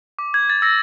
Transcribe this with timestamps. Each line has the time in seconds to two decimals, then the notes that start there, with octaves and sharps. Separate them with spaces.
0.19 D6
0.34 G#6
0.50 A6
0.62 E6 A#6